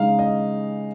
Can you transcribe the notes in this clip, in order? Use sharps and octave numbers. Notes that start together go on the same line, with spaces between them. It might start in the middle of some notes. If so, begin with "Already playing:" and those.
Already playing: C#3 G#3 D#4 F5
D#5